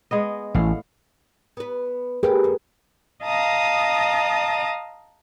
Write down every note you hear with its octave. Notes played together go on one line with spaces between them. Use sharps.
G#3 B3 D#5
A1 A2 F5 F#5
B3 B4
G4 G#4 A#4 B4
F2
D#5 F5 A5 A#5 D#6